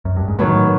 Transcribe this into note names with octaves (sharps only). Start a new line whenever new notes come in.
F#2
G2
G#2
A2 D#3 F#3 B3